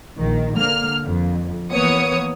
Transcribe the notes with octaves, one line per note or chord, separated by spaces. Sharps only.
A#1 D#3
D3 A#3 F6
F2
E3 A#3 B3 C#5 D#6 C#7